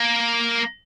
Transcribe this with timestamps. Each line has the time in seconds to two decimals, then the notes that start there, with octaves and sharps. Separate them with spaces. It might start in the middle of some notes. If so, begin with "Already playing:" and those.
Already playing: A#3